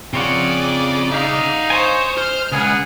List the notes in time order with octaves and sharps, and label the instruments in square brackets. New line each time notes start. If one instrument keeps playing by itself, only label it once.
[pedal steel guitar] C#3 C#5 F#5 [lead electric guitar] C4 F4 [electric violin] G#4 D5
[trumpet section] D#4 [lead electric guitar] E5 F5
[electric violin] C5 C#5 [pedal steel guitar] D#5 G#5
[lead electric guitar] C5 [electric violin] F6
[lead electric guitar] C#2 [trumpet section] G#4 F#5